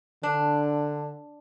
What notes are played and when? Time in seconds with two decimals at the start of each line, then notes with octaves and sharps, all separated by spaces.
0.23 D3 D4